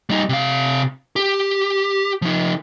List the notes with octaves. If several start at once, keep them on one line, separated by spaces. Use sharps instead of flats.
G3 D#4
C3 F5
G4
F3 D#4